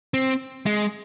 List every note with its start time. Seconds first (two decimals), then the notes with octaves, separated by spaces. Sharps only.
0.14 C4
0.66 G#3